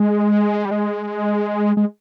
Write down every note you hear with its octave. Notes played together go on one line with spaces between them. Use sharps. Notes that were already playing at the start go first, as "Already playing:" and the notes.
Already playing: G#3
G3
G#3
G#3